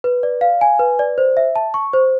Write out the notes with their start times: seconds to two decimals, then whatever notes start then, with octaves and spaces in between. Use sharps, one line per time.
0.04 B4
0.23 D5
0.41 F5
0.61 G#5
0.79 B4
0.99 D5
1.18 C5
1.37 E5
1.56 A5
1.74 C#6
1.93 C5